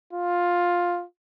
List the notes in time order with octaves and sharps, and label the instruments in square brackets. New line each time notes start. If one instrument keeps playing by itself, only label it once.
[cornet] F4